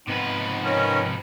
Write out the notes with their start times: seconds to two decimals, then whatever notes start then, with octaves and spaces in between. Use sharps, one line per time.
0.08 G#2 C3 F3 B3 C4 D#4 B4
0.64 D#3 C#4 A#4